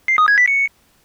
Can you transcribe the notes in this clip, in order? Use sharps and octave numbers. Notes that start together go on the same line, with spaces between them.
C7
D#6
G#6
B6
C#7